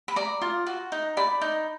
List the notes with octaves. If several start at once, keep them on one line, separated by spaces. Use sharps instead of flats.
B5
D5 A#5
F4
F#4
D#4
D5 B5
D#4